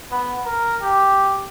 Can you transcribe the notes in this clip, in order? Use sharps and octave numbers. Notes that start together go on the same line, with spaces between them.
B3
A#4
G4